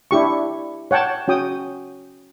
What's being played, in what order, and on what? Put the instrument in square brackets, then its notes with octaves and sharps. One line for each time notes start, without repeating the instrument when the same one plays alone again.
[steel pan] D4 E4 G4 C#6
C#5 F#5 G5 A5
C#4 F#4 G5 D#6